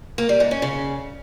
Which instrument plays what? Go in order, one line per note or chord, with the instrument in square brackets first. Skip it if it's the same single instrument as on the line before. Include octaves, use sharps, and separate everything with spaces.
[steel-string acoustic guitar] A#3
G3
G#2
C#4
C#3